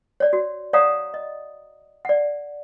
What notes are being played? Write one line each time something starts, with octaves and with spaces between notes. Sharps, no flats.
C#5 D5
F#4
C#5 D5 F5 F#5 A#5 D#6
D#5
D5 F#5